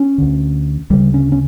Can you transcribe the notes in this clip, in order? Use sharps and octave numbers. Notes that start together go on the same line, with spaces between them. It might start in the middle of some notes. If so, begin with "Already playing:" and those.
Already playing: C#4
D2 D3
D2 C#3 G3
C#4
C#4